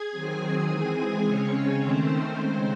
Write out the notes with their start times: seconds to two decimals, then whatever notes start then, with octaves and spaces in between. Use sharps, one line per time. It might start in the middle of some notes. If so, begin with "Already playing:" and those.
Already playing: G#4 G#5
0.11 D#3 F#3 C4
0.67 E3 G#3 C4
1.23 C#3 G#3 C4 C#4 C#5
1.79 D#3 A3 C4 C#4 C5
2.36 C#3 G#3 C4